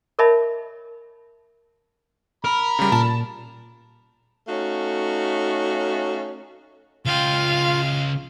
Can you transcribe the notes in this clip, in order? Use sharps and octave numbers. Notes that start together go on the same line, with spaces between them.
A#4 C#5 D#5 E5 A5 B5
A#4 B5
C#3 G3
A#2 A5
A3 C#4 D#4 F#4 F5
C#2 F4 F5 G5